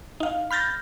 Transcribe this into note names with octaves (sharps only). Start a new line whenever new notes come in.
D#4 F5
B5 F6 G6 A6 A#6